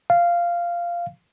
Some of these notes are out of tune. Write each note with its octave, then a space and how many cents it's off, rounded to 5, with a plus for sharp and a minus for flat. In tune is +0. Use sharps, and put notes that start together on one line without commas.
F5 -10